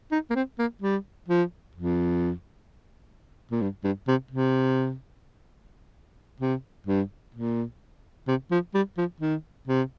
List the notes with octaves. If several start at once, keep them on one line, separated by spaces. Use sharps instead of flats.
D#4
A#3
C4
A#3
G3
F3
F2
A#2
G2
G2
C3
C3
C3
G2
A#2
C3
F3
G3
F3
D#3
C3